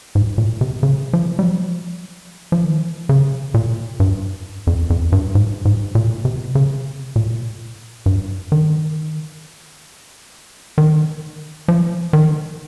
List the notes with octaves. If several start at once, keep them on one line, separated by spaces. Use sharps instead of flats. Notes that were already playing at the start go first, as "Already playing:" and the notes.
G#2
A#2
C3
C#3
F3
G3
F3
F3
D#3
C#3
A#2
G2
F2
F2
G2
G#2
G#2
A#2
C3
C#3
A#2
G2
D#3
D#3
F3
D#3